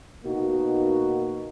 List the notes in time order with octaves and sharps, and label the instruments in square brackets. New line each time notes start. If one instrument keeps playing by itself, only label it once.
[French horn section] B2 A#3 D#4 F#4